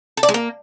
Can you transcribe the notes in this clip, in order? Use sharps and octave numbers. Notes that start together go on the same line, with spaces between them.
A4
D5
G#3
A#3